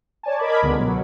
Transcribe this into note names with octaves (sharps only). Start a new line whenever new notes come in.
C#5 D5 G#5 A5
A#4 D#5 B5 D6 G#6
C#2 D3 G#3 B3
B2 F#3